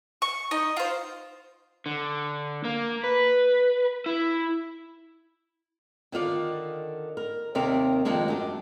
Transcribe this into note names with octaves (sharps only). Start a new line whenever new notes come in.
C#6
D#4 D#5
F4 C5
D3
A#3
B4
E4
D3 D#3 F4 D5
A#4
D#2 C3 D#3 C4 A#4 D5
F2 D#3 G#3 A#3 D4
F#2 D4